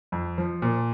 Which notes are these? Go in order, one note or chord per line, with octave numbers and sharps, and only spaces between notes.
F2
F3
A#2